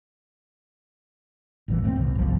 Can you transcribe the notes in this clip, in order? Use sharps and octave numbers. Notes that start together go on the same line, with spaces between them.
G1 E2 A#2 E3
A1 A3 B3 C4
C2
G1 C2 F3